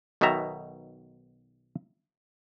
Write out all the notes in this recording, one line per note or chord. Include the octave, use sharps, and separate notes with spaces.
B1 B2 D#3 B3 E5 A#5